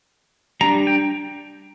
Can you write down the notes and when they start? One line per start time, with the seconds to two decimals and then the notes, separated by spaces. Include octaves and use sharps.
0.61 G3 D4 A#5
0.87 G5